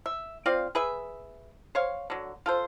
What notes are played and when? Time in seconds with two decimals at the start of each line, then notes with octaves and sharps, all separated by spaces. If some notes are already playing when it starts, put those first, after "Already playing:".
0.06 E5
0.46 C4 F4 D5 F5
0.75 G#4 B4 E5
1.75 C5 C#5 F5
2.10 D3 F#3
2.46 F4 A4 C5